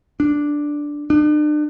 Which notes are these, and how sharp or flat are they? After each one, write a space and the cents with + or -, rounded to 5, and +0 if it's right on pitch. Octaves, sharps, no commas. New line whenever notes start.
D4 +0
D4 +40